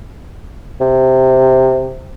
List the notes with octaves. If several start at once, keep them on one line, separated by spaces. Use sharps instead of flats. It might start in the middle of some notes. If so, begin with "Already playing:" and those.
C3